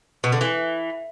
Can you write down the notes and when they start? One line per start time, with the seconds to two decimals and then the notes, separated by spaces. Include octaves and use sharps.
0.24 B2
0.32 D3
0.41 E3